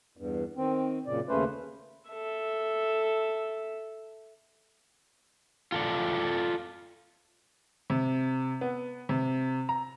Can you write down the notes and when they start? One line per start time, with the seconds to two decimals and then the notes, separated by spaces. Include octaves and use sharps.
0.17 E2 G2
0.57 D#3 C4
1.06 F#2 A#2 C#3 D5
1.29 D#2 C#3 A3 C#4 B4 C5
2.10 A4 E5
5.72 F4 A4 D5
7.90 C3
8.61 B3
9.09 C3
9.69 A#5